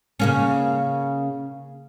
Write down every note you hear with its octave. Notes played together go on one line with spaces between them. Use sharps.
C#3 A#3 C#4